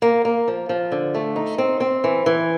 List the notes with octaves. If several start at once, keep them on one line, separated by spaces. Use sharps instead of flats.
A#3
A#3
F3
F3
D3
A3
D#4
C4
C4
E3
E3